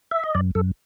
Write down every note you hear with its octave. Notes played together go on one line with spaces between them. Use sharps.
E5
D#5
F#2 D5
F#2 A4